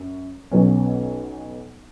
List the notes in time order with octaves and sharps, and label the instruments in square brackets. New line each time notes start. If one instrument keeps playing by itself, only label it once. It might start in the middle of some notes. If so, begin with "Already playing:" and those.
Already playing: [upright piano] F#2
B1 B2 F#3 C#4